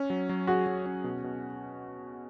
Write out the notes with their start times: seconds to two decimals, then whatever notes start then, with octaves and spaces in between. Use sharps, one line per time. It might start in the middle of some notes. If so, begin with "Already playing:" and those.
Already playing: C#4
0.10 F#3
0.29 F#3
0.47 F#4 G#4
0.67 F#3
0.86 C#4
1.04 B2
1.24 B2